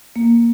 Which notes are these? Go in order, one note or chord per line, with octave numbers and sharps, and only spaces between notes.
A#3